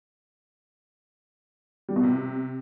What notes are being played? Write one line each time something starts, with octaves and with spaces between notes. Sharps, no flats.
G3
B2
C3